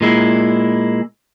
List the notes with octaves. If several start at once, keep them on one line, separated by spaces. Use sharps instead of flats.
A#2 G#3 E4